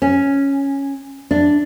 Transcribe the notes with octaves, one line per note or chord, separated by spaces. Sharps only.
C#4
D4